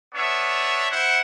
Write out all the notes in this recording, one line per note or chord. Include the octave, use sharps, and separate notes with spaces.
B3 D4 C#5 E5
E4 C5 F#5